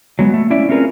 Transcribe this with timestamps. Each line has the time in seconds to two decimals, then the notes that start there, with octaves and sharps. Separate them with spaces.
0.19 F#3 G#3 B3
0.34 A3
0.50 C#4 E4 D5 E5
0.69 C4 C#4 F4 G#4 A#4 B4